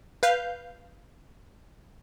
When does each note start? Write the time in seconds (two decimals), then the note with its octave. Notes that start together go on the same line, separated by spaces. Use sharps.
0.23 B4 F5 G6